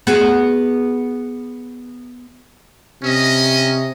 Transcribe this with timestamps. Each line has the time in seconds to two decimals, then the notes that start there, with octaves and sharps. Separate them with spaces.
0.07 B3 F#4 G#4
3.03 C3 C#4 D#5